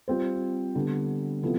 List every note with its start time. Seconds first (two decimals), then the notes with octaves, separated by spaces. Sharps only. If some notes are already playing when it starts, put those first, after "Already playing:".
0.08 G3 C4 F4 C5
0.75 D3 G3 B3
1.43 C3 F3 B3 E4 A4